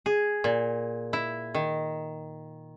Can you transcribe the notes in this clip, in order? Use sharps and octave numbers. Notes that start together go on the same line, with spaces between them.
G#4
A#2
E4
D#3